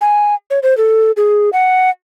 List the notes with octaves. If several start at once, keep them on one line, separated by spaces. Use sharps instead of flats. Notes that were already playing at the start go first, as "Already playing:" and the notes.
G#5
C#5
C5
A4
G#4
F#5